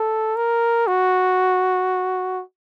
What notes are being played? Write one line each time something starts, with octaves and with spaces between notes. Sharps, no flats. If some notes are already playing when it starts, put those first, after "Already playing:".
Already playing: A4
A#4
F#4